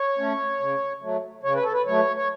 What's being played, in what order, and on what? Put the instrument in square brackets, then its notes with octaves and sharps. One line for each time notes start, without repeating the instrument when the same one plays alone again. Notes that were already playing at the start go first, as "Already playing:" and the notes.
Already playing: [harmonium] C#5
A3 C#4
C#3
F#3 A3
C#3 C#5
B4
A4
B4
F#3 A3 C#5
C#5